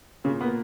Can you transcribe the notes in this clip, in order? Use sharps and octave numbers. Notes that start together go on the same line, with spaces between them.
A#2 C#3
A#3 B3